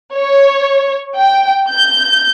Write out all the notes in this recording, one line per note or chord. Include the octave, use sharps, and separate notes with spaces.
C#5
G5
G6